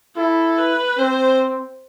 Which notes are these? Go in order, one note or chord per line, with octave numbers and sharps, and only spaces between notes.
E4 A4
B4
C4 C5